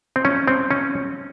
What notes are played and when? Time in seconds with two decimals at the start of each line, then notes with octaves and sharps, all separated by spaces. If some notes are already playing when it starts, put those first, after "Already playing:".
0.16 C4
0.25 C#4
0.48 C4
0.71 C#4